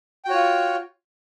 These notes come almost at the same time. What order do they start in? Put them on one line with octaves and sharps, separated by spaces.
G5 F#4 C#5 F4